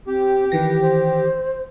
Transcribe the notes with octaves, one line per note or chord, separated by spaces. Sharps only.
C4 G4
D#3 E3 B4 A#6
C5